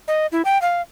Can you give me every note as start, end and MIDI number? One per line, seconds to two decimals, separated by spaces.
0.08 0.27 75
0.32 0.42 64
0.45 0.60 79
0.62 0.81 77